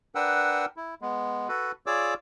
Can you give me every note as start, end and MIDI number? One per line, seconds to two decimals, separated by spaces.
0.15 0.66 62
0.15 0.66 70
0.15 0.66 71
0.15 0.66 78
0.15 0.66 79
0.15 0.66 88
0.77 0.95 64
1.02 1.48 56
1.02 1.48 59
1.48 1.72 66
1.48 1.72 69
1.48 1.72 71
1.86 2.14 65
1.86 2.14 68
1.86 2.14 73
1.86 2.14 74
1.86 2.14 86
1.86 2.14 88